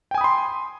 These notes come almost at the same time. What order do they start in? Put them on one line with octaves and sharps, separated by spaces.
G5 G#5 D#6 B5 C6